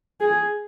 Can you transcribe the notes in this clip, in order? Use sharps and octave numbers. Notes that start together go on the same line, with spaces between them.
G#4